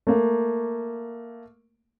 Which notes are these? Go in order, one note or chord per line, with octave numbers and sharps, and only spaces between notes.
A3 A#3